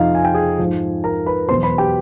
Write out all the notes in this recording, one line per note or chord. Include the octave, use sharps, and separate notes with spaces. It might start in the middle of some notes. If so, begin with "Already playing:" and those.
Already playing: F2 C3 F3 D#4 F4 D#5 F5
G#5
G5
G#4 G#5
G#2 F3
A#4 A#5
B4 B5
E2 B2 F#3 C5 C6
B4 B5
G4 G5